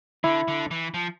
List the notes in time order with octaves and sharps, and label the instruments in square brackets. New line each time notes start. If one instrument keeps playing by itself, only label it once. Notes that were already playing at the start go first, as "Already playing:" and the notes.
[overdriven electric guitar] D3 [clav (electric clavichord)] E4
[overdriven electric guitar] D3
E3
F3